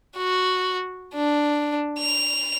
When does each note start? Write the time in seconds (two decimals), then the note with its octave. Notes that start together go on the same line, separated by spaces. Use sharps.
0.17 F#4
1.14 D4
1.99 F7